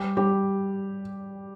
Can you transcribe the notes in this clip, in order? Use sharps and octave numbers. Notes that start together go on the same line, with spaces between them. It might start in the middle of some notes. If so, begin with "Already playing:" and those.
Already playing: G3 G4
G3 G4